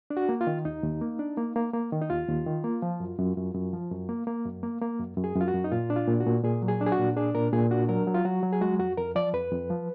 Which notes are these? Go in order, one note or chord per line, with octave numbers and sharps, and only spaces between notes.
D4
F#4
A#3
F4
D#3
D#2 D#4
D#2
A#3
D4
A#3
A#3
A#3
D#3
D#4
D#2 F4
D#2
D#3
A#3
F3
F#2
F#2
F#2
F#2
F3
F#2
A#3
A#3
F#2
A#3
A#3
F#2
F#2
G#4
F#2
F4
F#4
F#2
D#4
A#2 F4
D4
F4
A#2
F#4
A#2
A#2 G#4
F#3
G#4
D4
G#4
F#4
A#2
D4 G#4
A#2 A#4
A#2 G#4
D4 F#4
F#3 A#4
F#3
F4
F#3 F#4
F#3
G#4
G#3 F#4
F2 F#4
F2 A#4
F3 D5
F2 B4
F2
F3